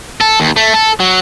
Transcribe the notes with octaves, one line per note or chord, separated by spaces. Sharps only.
A4
D#2
A3
A4
F#3